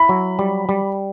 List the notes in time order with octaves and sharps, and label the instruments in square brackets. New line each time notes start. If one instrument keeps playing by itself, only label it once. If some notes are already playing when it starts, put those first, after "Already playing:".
Already playing: [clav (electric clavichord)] E4 [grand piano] B5
[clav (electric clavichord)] F#3
G3
G3